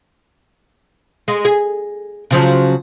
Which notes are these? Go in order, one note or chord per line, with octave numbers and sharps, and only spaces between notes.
G#3
G#4
C#3 F3 F#3